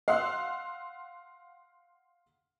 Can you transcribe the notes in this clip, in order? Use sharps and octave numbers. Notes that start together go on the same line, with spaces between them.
F5 F#5 C6 E6 F#6